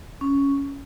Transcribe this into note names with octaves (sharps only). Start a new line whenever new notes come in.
C#4